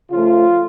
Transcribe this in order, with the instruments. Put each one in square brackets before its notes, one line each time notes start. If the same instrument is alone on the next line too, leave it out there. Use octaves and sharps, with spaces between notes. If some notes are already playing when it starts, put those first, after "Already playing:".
[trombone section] C#3 F3 A3 F4